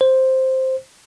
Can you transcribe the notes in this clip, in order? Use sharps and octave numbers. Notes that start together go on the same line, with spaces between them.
C5